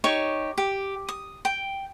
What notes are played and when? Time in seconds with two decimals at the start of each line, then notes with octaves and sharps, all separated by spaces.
0.04 D#4 G4 C#5 C#6
0.58 G4
1.09 D#6
1.45 G5